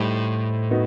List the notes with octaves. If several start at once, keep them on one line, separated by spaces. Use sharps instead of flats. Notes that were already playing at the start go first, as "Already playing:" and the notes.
Already playing: A2 G3 D#4 G4 C5
B3 D#4 F#4